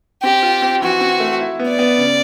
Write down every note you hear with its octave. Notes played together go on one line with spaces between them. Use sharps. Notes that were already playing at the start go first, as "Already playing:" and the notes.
C4 G4
F4
C4
E3 F#4
C4
A3
E4
B3
D5
B3
C#3